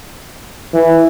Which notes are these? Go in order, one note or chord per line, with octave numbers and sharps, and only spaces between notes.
E3